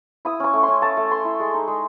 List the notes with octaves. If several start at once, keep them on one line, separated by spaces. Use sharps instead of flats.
E4 D#6
C#4 C#6
A3
C6
C#4
A3 A5
A3
A3 C6
E4
G#3
D#4
G#3